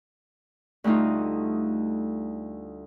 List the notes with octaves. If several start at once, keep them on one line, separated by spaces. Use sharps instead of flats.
D2 G3 A3 D#4 F4